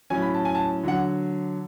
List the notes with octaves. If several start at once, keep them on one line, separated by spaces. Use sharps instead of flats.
A2 F#3 C#4 G#5
B5
A5
G#5
A5
D3 F#3 F#5